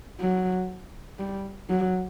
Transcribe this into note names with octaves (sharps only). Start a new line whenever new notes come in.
F#3
G3
F#3